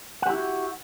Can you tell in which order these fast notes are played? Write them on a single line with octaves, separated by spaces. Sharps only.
F#5 G4 E4 F#4